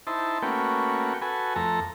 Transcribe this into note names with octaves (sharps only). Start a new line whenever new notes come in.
D#4 E4 C5 A5
A3 A#3 C#4 F#4 B4 G5
F#4 A4 B4 G#5
F2 A3 A4 A#5